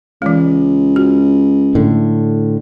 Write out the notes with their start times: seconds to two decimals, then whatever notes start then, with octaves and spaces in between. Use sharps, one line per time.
0.22 C#2 E3 G#3
0.96 F#4
1.75 A2 D3